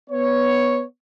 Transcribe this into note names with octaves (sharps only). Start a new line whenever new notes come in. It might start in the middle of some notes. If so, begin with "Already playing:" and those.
B3 C#5